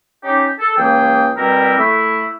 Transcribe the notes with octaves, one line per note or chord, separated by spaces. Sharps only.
C#4 D#4 G4
A4
C#2 E3 A#3 G#4 G5
B2 G3 C4 E4 G4 A#4
A3 E4